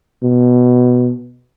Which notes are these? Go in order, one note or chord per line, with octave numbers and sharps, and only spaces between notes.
B2